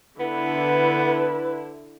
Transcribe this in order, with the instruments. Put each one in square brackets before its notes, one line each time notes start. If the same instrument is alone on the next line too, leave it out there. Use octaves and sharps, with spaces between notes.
[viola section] D3 E4 [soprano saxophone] B3 [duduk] B4